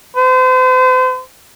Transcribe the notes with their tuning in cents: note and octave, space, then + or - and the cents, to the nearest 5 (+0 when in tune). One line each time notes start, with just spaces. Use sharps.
C5 -40